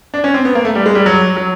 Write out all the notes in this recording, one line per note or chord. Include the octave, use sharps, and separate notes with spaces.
D4
C#4
C4
B3
A#3
A3
G3
G#3
G3
F#3
F#3